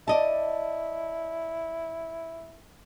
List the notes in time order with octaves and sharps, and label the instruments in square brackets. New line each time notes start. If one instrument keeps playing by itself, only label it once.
[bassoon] E4 [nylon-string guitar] D5 D#5 A5